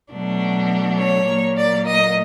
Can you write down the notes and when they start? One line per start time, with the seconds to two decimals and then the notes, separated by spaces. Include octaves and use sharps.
0.12 B2 F#3 A3 D4
0.99 C#5
1.28 A#2 F#3 A#3
1.57 D5
1.86 D#5